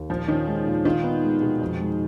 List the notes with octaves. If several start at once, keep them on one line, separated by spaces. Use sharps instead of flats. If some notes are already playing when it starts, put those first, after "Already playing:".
Already playing: D#2
A#2 F3
D#3 C#4
G#3
A#2
D#3 F4
B3
G#3
B2
F2
G#3